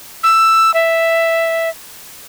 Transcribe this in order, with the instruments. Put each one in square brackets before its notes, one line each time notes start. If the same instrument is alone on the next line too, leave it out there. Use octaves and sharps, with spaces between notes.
[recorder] E6
E5